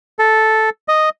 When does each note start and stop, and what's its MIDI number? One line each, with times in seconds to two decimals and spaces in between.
0.19 0.70 69
0.88 1.09 75